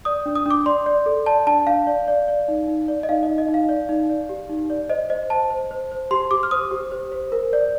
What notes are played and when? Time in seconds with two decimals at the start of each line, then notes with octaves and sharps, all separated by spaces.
0.05 D5 D#6
0.26 D4
0.36 D#6
0.46 D4 D6
0.66 D5 C6
0.86 D5
1.06 A4
1.26 D5 A5
1.47 D4 A5
1.67 D4 F5
1.87 D5
2.08 D5
2.28 D5
2.48 D#4
2.68 D#4
2.88 D5
3.03 D#5
3.09 D#4 F5
3.23 D#5
3.28 D#4
3.38 D#5
3.49 D#4
3.54 F5
3.69 D5
3.89 D#4
4.10 D5
4.29 G4
4.49 D#4
4.70 D5
4.90 C5 D#5
5.10 C5 D#5
5.30 C5 A5
5.50 C5
5.71 C5
5.92 C5
6.11 G4 C6
6.31 G4 D6
6.43 F6
6.51 C5 D#6
6.71 G4
6.92 C5
7.12 C5
7.32 A#4
7.53 D5